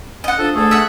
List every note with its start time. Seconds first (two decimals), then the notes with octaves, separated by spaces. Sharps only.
0.24 D#5 F#5
0.38 F3 D4 A4
0.56 D2 A3 G#4 A4
0.71 E5 F#5